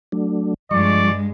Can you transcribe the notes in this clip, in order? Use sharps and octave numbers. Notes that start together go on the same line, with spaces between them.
F#3 A3 D4
G2 F3 G#3 D5 C#6